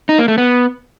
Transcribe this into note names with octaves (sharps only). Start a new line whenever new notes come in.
D#4
A#3
A3
B3